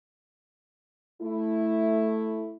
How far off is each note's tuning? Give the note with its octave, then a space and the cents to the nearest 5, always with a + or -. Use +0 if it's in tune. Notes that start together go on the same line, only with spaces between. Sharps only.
A3 +0 E4 +0